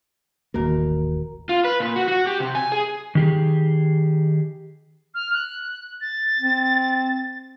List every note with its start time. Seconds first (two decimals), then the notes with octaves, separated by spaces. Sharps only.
0.54 D#1 A1 D#3 A#3 F#4 A#4
1.49 F4
1.64 B4
1.80 A#2
1.96 F#4
2.08 F#4
2.27 G4
2.40 C3
2.55 G#5
2.72 G#4
3.15 D#3 G4 G#4
5.15 F6
5.34 F#6
6.01 A6
6.39 C4